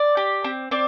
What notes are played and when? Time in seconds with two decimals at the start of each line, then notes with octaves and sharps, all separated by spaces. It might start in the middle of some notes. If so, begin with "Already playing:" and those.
Already playing: D5
0.17 G4
0.44 C4
0.71 C4 D5